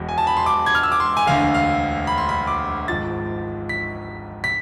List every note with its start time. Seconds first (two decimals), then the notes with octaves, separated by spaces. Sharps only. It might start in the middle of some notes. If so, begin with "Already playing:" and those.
Already playing: E1 E2 B2
0.09 G#5
0.18 A5
0.27 B5
0.37 C6
0.46 D6
0.66 G#6
0.75 F6
0.83 E6
0.92 D6
1.00 C6
1.17 G#5
1.26 E1 D2 D3 F5
1.54 F5
2.07 B5
2.18 C6
2.29 B5
2.47 D6
2.88 G#1 G#2 F3 A6
3.69 B6
4.44 B6